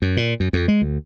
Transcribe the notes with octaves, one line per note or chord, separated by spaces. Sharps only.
F#2
A#2
F#2
F2
G#3
D2